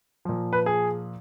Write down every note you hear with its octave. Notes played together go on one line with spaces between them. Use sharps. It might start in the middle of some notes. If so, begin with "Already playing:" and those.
A#2 F3
B4
G#4